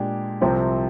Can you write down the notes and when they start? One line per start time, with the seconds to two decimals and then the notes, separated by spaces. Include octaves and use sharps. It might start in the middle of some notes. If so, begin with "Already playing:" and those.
Already playing: A#2 G#3 D4 G4
0.41 C2 C3 F3 C4